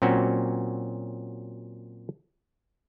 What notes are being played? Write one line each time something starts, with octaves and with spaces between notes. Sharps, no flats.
A#2 F#3 C4 C#4 F#4